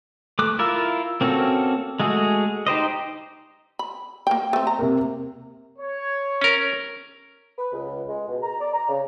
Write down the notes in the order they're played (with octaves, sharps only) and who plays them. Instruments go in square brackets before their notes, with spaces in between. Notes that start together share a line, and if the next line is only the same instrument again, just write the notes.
[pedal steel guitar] A3 D6 F#6
E4 F4 A#4 E5
A#3 C4 C#4 F#4 A4
G#3 A3 F#4 G#4
D#4 G4 C5 D#5
[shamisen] B5
A#3 G5
A3 C4
A#5
[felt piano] C3 A#3
[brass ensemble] C#5
[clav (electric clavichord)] C#4 A#4
[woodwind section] B4
C#2
G#3
B2
A#5
D5
A#5
C#3